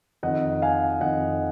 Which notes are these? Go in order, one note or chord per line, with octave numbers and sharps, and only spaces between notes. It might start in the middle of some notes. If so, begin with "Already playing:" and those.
F2 D#3 D#5 F#5
F5 G#5
F2 D#3 D#5 F#5